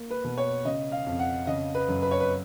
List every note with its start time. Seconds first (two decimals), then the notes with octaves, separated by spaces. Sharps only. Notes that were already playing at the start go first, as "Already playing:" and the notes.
Already playing: A#3
0.11 B4
0.24 B2
0.38 C#5
0.65 C#3 D#5
0.92 F5
1.07 F2
1.19 F#5
1.47 C#3 D#5
1.75 B4
1.88 F#2
2.02 B4
2.11 C#5
2.20 B4